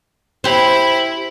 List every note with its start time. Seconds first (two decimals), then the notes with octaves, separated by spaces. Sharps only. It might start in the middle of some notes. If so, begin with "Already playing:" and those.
0.44 E4 G4 C5 B5